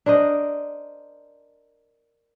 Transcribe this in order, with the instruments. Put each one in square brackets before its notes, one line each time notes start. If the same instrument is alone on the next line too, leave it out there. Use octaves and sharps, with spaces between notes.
[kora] D4 A#4 C5 D#5